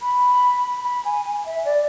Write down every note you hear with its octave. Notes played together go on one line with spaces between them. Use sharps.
B5
B5
G#5
G#5
E5
D5